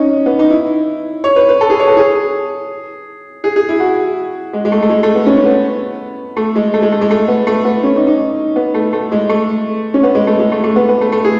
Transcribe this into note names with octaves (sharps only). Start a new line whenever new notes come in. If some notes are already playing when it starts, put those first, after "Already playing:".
Already playing: C#4 D#4
B3
D#4
E4
C#5
B4
B4
A4
G#4
C#5
A4
G#4
G#4
G#4
E4
F#4
G#3
G#3
A3
A3
G#3
A3
B3
C#4
C#4
B3
A3
G#3
A3
G#3
A3
G#3
A3
B3
A3
B3
C#4
D#4
D#4
B3
A3
A3
G#3
A3
C#4
B3
G#3
A3
G#3
A3
A3
B3
B3
A3
A3
G#4